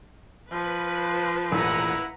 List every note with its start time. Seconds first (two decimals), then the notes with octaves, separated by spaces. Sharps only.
0.51 F3 B4
1.51 E1 A1 A#2 E4 B4 F#5 A#5